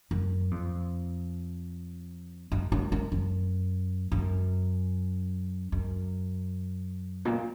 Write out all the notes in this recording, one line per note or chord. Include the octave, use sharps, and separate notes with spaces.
F#2
F2
F#2
F#2
F#2
F#2
F#2
F#2
A#2